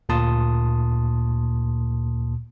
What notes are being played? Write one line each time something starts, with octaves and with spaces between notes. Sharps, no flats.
D2 A#2 A#3 A5 C6 D#6